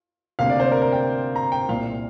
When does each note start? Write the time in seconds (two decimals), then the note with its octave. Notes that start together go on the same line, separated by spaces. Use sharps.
0.39 D2 C3 A#3 F5
0.50 D5
0.60 C5
0.72 A#4
0.82 A#4
0.92 G5
1.36 A#5
1.52 G5
1.68 C2 A#2 A#3 F5